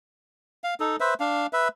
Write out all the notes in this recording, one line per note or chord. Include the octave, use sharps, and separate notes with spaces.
F5
D#4 A4
B4 C5 E5
D4 F5
B4 E5